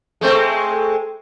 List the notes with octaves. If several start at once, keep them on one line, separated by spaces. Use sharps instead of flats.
G#3 A3 C4